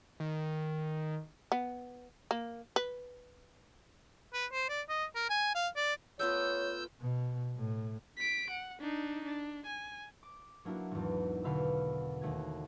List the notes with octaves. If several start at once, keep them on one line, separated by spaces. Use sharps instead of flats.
D#3
B3
A#3
B4
B4
C5
D5
D#5
A#4
G#5
F5
D5
A3 B3 F4 C#5 E6 G6
B2
A2
B6 D7
F#5
D4 D#4
D4
G#5
D6
F#3 A#3 D4 E4 F#4
G#1 E2
E2 B2 D3 F5 B5 E6
D#2 A3 F#4 G#6